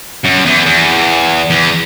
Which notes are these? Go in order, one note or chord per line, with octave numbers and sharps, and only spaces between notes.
F#2
E2
E2
E2